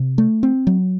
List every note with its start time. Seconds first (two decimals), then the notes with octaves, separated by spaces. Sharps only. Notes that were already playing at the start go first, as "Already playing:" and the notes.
Already playing: C3
0.18 A3
0.43 C4
0.67 F#3